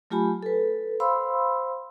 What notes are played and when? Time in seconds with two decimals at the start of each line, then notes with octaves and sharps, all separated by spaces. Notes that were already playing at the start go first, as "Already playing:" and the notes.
0.11 F#3 A3 F4 G4 G#5 B5
0.43 A4 B4
1.00 C5 F5 B5 C6 E6